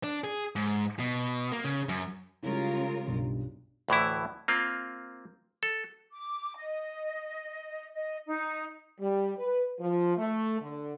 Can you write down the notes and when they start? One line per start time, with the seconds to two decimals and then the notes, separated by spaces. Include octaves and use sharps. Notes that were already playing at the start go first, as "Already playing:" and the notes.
0.03 D4
0.24 G#4
0.56 G#2
1.00 B2
1.52 A#3
1.65 C#3
1.89 F#2
2.43 C#3 G3 G#3 E4 F4 A#4
3.07 B1 G2 B2
3.88 D2 A2 E3 E4
4.48 A#3 C4 F4
5.63 A4
6.13 D6
6.56 D#5
7.94 D#5
8.27 D#4
9.00 G3
9.37 B4
9.80 F3
10.18 A3
10.61 D3